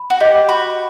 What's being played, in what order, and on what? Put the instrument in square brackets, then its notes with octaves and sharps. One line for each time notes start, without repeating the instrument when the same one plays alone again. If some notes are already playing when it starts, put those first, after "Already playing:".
Already playing: [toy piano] B5
[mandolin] F#4
[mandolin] G4 [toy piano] D#5
[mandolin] F#4 [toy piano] B5